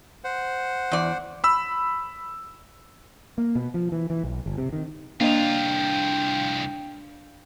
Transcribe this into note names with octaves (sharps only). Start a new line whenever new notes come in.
C5 F#5
E2 D5
B5 E6
A#3
B2
F3
E3
E3
B1
G1
C3
D#3
C2 A#3 D4 F4 C5 D#5 F5 G5